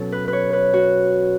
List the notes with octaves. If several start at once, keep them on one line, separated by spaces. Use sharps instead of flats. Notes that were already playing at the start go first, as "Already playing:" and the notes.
Already playing: B2 F#3 C#4 A4
B4
B4
C#5
B4
F#4